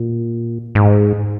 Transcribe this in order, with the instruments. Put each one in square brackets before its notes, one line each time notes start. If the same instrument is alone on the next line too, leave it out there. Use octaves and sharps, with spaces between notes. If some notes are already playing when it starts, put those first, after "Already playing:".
Already playing: [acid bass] A#2
G#2